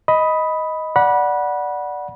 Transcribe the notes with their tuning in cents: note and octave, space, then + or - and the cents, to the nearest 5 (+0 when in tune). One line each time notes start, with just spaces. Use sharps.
D#5 +10 B5 +0
D5 +0 F#5 +0 B5 -25